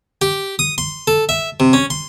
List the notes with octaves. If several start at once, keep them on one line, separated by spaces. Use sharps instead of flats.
G4
D#6
C6
A4
E5
C3
C#4
C6